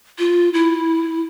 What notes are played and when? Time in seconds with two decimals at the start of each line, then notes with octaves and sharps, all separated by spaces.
0.19 F4
0.54 E4